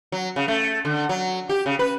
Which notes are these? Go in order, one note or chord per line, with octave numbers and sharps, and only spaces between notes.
F#3
C#3
A3
D3
F#3
G4
C#3
B4